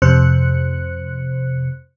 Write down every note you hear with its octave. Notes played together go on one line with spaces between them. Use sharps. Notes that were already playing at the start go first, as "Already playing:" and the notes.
F2 C3 C5 F#6 C#7